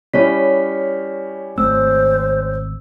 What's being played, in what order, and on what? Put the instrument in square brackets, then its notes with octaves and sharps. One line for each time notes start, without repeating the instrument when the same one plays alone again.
[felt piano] G3 C#4 E4 [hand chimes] C#5 B6
[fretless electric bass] G#1 A3 C4 [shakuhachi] C5 [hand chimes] E6